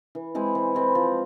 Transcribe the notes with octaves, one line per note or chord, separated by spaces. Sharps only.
E3
G#3 C4 E4
E3
G#3 C4 E4
F3